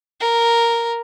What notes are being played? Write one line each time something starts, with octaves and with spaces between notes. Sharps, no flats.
A#4